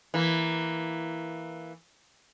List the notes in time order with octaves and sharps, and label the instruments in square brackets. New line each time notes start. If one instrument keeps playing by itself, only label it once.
[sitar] E3 A#3